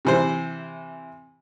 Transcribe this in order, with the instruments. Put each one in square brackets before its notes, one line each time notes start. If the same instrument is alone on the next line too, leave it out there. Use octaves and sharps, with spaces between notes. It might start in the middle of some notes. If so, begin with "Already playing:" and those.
[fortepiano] C3 E3 C5